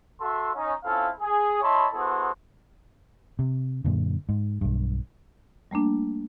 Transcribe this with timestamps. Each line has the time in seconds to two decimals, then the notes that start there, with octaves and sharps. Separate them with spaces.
0.20 F#4 A4 E5 C6
0.54 C#4 D#4
0.83 C4 C#4 E4 F4 A4 F5
1.20 G#4
1.61 E4 C#5 D#5 A5 B5 C6
1.93 B3 E4 F#4 G#4 A4 C5
3.39 C3
3.85 F#2 A#2 D3
4.29 G#2
4.61 B1 G2
5.71 G3 A3 A#3 D4